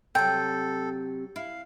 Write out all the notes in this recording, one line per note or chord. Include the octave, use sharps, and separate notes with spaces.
C3 F#3 A4 G5
E4 F5